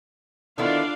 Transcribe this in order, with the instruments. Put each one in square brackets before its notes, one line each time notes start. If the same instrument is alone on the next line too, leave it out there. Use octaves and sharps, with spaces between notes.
[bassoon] D3 [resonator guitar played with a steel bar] D#3 B3 E4 [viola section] D4 F4 D5 [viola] F5